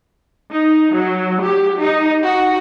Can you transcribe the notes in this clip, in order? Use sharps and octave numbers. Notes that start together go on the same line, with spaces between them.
D#4
F#3
G4
D#4
F#4